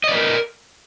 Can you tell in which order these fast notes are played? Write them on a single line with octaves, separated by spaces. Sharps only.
D#5 D5 B4 A#4